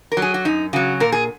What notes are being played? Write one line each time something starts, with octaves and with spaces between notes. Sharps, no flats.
A#4
F#3
G#4
F#4
F#2 D#4
C#3 F#3 F#4
A#2 A#4
G#4